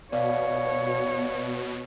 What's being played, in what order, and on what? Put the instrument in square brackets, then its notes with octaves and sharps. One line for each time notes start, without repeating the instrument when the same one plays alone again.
[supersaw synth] B2 [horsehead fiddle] C#5 [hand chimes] D5 F5